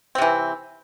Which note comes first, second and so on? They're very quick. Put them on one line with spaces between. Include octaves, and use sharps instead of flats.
C4 C3 E3